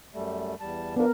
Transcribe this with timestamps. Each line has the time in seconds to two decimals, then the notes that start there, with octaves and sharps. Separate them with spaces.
0.14 F#2 G3 A3
0.60 E2 G3 A5
0.96 F3 B3 D4 A#4